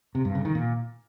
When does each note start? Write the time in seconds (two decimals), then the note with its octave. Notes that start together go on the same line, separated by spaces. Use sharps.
0.15 C3
0.25 G2
0.35 C#3
0.45 D#3
0.55 A#2